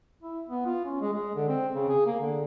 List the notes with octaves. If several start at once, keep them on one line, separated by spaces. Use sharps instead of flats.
E4
B3
F4
C#4
G#3
G#3
D3
C4
C#3
G#4
A#3
D3